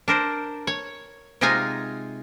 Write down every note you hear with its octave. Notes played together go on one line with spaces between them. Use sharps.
D4 A#4 C5
C#5
C3 G#3 D#4 F4 G#5 A#5